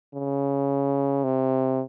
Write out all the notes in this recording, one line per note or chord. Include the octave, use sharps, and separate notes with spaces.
C#3
C3